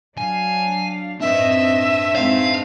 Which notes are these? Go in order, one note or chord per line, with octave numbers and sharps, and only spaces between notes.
F#3 D4 F5 G#5
C4 D4 B4 D#5 E5
G#3 C4 D#4 F5